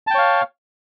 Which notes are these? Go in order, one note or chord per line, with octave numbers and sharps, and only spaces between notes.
C#5 F5 G5 A5